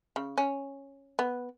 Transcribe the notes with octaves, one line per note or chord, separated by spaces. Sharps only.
C#3
C#4
B3